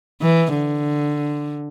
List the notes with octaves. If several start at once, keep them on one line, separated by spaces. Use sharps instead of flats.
E3
D3